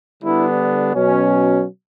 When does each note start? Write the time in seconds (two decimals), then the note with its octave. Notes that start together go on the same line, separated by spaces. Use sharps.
0.22 D3 G3 B3 D4 E4
0.94 B2 F#3 C#4